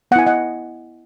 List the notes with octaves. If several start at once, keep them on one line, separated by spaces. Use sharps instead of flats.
B3 E4 F#5 G#5
D#5 F#5